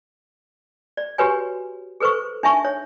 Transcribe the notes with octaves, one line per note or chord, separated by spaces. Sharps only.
D5
F#4 G4 B4 C#5 G#5
G#4 A4 B4 C5 C#6
D4 D#4 E5 G#5 C#6
C#5